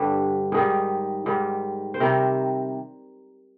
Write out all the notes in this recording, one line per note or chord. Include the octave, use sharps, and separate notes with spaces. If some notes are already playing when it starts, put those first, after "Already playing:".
Already playing: G2 D3 G3
G#2 D#3 G3 G#4
G#2 D#3 G3
C5
C3 D#3 G3 A#4